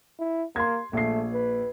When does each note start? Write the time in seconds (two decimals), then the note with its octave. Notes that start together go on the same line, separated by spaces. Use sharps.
0.19 E4
0.56 A#3 C6 G#6
0.93 A#1 A3 C7
1.33 B4